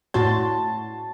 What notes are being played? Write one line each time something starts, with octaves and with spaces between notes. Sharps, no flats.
A2 F#4 A5 C6